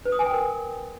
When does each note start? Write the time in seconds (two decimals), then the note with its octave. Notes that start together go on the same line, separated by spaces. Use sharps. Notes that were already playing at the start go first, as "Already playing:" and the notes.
0.05 B4
0.12 D#6
0.19 G#5
0.26 G5
0.33 A#4